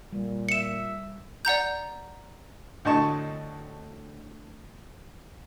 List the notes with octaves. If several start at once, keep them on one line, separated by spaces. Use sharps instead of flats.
A#2 G3
E5 C#7 E7
D5 F#5 A#5 G6
D2 A2 D4 D#5 A5 C#6